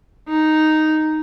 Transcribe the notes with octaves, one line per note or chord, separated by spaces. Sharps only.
D#4